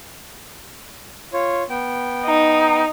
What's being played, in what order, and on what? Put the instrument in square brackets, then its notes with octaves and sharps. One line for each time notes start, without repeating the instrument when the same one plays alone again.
[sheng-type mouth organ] F4 C#5
B3 G5
[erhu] D#4